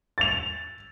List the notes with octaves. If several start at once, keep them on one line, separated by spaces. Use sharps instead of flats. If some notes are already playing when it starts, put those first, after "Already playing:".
A6 F7